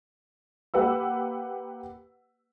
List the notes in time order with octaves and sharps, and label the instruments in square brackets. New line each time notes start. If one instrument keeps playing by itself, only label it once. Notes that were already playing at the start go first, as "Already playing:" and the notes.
[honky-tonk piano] A#3 G4 B4 F#5 E6